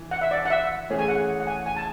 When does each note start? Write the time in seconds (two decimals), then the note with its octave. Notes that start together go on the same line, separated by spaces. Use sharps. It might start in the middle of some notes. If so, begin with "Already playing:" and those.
Already playing: E3
0.11 F#5
0.21 E5
0.31 D5
0.45 F#5
0.50 E5
0.90 E3 A3 C#4 G#4
0.99 G#5
1.08 F#5
1.40 F#5
1.47 G#5
1.66 G#5
1.77 A5